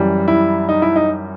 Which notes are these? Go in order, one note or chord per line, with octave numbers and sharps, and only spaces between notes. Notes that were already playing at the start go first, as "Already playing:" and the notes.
Already playing: F#2 E3 G3
E4
D#4
E4
D#4